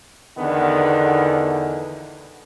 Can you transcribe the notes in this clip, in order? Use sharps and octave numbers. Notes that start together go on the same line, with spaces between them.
E2 D3 D#3 B3